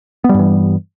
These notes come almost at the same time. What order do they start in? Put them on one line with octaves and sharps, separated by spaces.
B3 G3 G2 E3